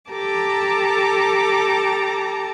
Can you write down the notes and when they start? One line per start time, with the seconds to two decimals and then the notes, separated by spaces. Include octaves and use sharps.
0.11 G4 A4 A5 A#5 D6